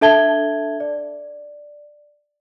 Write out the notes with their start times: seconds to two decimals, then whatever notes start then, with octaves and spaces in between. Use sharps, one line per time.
0.01 D4 A4 E5 A5 G#6 G7
0.80 D5